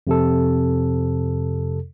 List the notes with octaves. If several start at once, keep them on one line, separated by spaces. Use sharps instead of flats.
F2 C3 A4